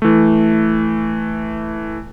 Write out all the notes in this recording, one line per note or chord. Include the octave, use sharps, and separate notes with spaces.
E3 A3